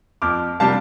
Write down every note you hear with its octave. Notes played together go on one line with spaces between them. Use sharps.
F2 D6 F6
C3 G3 D4 F5 A5